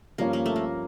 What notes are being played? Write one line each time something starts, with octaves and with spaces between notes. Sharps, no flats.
G2 F3 A#3 C#4 F4 A#4
A#3
A3
A#3